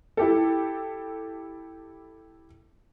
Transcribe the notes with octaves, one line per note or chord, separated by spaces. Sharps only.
E4 G4 A4